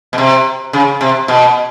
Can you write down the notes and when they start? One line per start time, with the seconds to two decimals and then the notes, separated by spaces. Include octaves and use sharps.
0.13 B2
0.18 C3
0.73 C#3
1.01 C3
1.28 B2